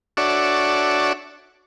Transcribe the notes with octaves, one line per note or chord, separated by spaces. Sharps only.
D4 F#4 A4 C#5 D5 E5